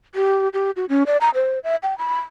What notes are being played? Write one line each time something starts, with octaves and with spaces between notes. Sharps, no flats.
G4
G4
F#4
C#4
D5
A#5
C5
E5
G5
B5